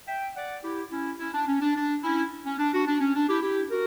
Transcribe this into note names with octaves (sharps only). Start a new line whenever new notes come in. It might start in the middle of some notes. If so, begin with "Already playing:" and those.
E5 G5
D5 F#5
E4 G4
C#4 E4
C#4 E4
D4
C#4
D4
D4
C#4 E4
C#4
D4
D4 F#4
D4
C#4
D4
E4 G4
E4 G4
F#4 A#4